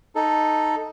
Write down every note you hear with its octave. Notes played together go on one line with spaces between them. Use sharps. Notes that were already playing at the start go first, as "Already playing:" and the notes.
D#4 A4